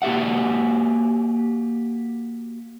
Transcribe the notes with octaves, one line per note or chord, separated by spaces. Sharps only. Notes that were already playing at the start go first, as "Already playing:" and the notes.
A#3 F#4 G4 E5 F#5